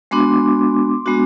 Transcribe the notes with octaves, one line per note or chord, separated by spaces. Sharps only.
G#3 B3 D4 F#4 C6 D6
G#3 B3 D4 F#4